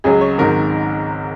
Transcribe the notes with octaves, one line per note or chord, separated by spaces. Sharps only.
C#2 C#3 F#3 G#4
C#5
G#1 G#2 D#3 F#3 A#4